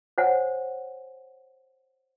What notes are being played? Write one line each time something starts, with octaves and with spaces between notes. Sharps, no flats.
C5 C#5 F#5 G#5